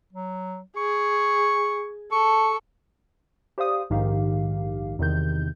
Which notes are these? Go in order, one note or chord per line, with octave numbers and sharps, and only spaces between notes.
F#3
G#4 C#6
A4 C#6
G4 C5 D5 F5 D#6
A#1 G#2 D#3 G4 F5
E2 C3 D#3 G6